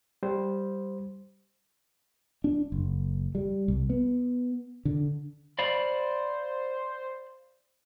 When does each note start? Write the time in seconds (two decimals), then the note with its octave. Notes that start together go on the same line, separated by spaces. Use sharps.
0.23 G3 C5
2.44 D4
2.72 F#1
3.35 G3
3.68 C2
3.90 B3
4.85 D3
5.59 C5 D5 F5 B5